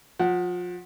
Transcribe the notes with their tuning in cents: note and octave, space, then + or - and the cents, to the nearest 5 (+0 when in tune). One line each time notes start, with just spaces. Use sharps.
F3 +30 F#5 +0